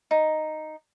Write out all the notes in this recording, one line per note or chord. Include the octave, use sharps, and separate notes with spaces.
D#4